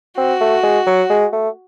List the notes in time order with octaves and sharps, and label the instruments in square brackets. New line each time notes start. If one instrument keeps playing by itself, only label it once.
[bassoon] C4 [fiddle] F#4
[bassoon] A3
G#3
F#3
G#3
A3